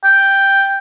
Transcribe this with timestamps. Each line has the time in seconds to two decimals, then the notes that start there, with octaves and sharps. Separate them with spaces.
0.04 G5